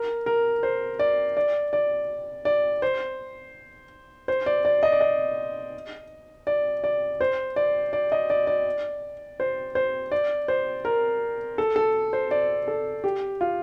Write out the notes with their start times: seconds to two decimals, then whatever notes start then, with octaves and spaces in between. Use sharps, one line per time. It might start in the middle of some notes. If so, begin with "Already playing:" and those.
Already playing: A#4
0.26 A#4
0.63 C5
0.99 D5
1.37 D5
1.73 D5
2.45 D5
2.82 C5
4.28 C5
4.46 D5
4.65 D5
4.83 D#5
4.92 D5
5.01 D#5
6.47 D5
6.84 D5
7.21 C5
7.56 D5
7.93 D5
8.12 D#5
8.30 D5
8.47 D5
9.40 C5
9.75 C5
10.12 D5
10.48 C5
10.85 A#4
11.58 A4
11.76 A4
12.13 C5
12.31 D5
12.68 A4
13.04 G4
13.41 F4